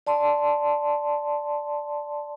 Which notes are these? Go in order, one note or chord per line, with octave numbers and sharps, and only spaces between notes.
D5 A5 C6